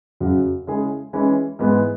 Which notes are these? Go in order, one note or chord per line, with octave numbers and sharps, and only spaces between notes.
F#2 C#3 F#3
C#3 G#3 C#4 E4 G#4
E3 G#3 C#4 E4
G#2 E3 G#3 B3